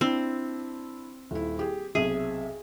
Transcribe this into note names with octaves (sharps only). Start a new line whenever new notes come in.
C4 D4 E4 E6
D#1 E4
G4 G#4
B1 C3 G#4 E5